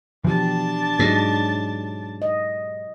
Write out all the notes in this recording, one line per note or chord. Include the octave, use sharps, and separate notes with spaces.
B2 E3 F3 D4 G4 A5
G#2 F#3
D#5